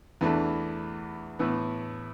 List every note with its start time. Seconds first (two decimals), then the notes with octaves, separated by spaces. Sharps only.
0.21 E2 E3 A3 D4
1.39 A2 E3 B3